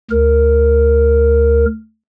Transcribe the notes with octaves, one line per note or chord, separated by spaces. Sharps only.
D2 A#4